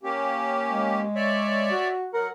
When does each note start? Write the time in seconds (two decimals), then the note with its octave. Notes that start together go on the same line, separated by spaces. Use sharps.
0.03 A#3 C#4 G4
0.70 G#3
1.15 C#5 D5 E5
1.71 F#4
2.14 F#3 A#4 F#5